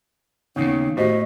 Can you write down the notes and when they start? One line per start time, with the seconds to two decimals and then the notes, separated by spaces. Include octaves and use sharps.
0.56 D#2 A#2 C#3 B3 C#4 D#4
0.97 A2 F#4 G4 C5 D#5